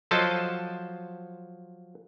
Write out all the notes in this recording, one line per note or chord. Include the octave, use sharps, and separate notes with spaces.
F3 F#3 A4 C5 D#5 A5